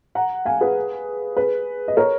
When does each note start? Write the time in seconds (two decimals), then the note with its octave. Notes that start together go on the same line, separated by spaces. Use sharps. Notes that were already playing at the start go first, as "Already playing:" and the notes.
0.15 F#5 A#5
0.45 F5 G#5
0.61 G#4 B4
1.37 G#4 B4
1.88 D#5
1.97 A#4 C#5